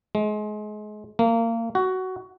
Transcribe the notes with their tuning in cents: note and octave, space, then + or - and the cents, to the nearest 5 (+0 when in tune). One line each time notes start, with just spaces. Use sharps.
G#3 +30
A#3 -25
F#4 +15